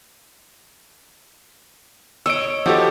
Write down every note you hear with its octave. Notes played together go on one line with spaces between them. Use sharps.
C#5 D#5 E6 D7
F3 D#4 F#4 G4 A4